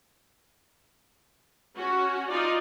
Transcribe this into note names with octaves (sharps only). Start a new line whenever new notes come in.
C#4 F#4
D#4 F4 D5